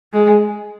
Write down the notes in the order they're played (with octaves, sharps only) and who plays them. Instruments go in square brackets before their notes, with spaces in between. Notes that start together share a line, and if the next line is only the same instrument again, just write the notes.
[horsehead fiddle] G#3